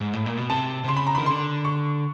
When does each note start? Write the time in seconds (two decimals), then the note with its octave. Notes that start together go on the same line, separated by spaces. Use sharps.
0.01 G#2
0.13 A2
0.26 A#2
0.37 B2
0.50 C3 A5
0.84 C3
0.88 C#3 C6
0.97 B5
1.07 A#5
1.15 D#3 B5
1.26 D3 C6
1.65 C#6